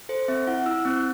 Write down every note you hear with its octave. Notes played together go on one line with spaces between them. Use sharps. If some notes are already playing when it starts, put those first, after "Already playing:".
A4 C5
C4 E5
E4 F#5
E4 E6
C4 F#6